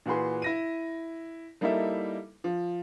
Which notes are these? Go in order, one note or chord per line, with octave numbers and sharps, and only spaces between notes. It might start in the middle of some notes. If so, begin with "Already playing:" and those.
A#2 E3 F#4 G#4 B4 C6
E4 A#6 D#7
G3 A#3 D#4 E4 A4 E5
F3